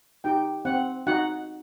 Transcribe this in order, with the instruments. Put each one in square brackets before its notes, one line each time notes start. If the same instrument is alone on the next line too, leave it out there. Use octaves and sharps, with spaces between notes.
[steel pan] D#4 G4 G5
C4 F#5
D#4 F#4 F#5